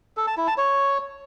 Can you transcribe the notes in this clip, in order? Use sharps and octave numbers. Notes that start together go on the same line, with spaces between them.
A4
A5
E4
A5
C#5